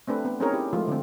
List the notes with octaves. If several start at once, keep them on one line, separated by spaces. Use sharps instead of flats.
A3 C4 D4 B4
B3
C4 C#4 D#4 G#4 A#4 C#5
E4 G4
F3 G#3 A3 F4
D3 C4